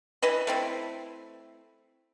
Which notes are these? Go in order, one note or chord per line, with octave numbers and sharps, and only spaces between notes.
E3 B4 D#5 B5
A3 C4 E4 B5